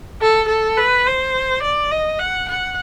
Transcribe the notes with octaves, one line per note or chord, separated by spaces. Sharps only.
A4
A4
B4
C5
D5
D#5
F#5
F#5